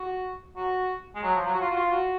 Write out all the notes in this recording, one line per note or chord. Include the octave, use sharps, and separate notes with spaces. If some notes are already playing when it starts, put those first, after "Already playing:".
Already playing: F#4
F#4
G#3
F#3
F3
F#3
F#4
F4
F#4
F4
F#4